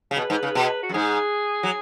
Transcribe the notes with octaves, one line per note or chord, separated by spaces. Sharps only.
C#3
B2 B4
G#2
C#3
B2
F#4
F#2
G#2 G#4
F#3